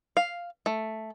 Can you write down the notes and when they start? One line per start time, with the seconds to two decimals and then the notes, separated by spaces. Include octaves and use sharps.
0.17 F5
0.66 A3